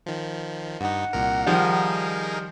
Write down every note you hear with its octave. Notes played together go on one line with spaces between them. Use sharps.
D#3 F3
G2 D#4 F#5
C2 A#2 A#4
D#3 F3 G3 D#4 G#4 A#4